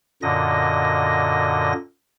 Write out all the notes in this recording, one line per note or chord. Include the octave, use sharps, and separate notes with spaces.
F#2 A#2 D3 D#5 A#6